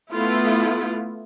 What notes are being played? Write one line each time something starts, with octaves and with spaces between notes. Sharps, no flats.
A3 B3 E4 F4